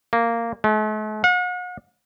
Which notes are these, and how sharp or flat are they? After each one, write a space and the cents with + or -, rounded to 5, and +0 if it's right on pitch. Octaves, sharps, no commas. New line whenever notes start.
A#3 -10
A3 -45
F#5 -40